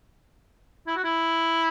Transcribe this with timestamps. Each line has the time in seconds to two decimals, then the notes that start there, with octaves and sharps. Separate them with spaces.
0.87 E4
0.96 F#4
1.04 E4